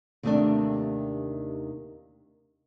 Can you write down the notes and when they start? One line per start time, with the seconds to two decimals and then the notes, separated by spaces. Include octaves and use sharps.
0.23 D#2 C3 D#3 A3 B3 D4